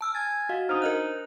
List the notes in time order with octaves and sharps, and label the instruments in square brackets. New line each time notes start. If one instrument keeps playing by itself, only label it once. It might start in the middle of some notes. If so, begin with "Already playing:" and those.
[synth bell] A5 E6 F6
[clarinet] G#5 [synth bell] A6
[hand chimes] F#4 D#5 F5
[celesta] D4 D#6 F6 [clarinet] D#4 [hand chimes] C5
[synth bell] A#4 D#5 F#6